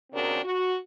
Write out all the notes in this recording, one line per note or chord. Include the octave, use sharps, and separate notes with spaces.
D#2 C#3 C4 D4 F#4 A#4
F#4